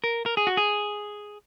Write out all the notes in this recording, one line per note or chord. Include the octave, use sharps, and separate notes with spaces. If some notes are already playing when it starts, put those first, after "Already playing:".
A#4
A#4
G#4
F#4
G#4